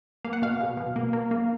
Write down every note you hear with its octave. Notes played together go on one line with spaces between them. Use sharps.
A#3 F5
F#5
B2 F5
B2
B2
A#3
A#3
A#3